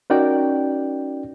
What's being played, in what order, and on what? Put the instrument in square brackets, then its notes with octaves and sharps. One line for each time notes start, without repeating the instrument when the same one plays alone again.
[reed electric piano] C#4 D#4 F#4 A#4 D5 G5